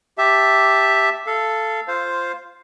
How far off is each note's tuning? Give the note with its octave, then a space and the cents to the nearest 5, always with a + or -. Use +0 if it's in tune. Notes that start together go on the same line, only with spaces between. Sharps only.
G4 +0 E5 +0 A5 +0
A4 +0 F5 -25
F4 -10 C5 +0 F5 +0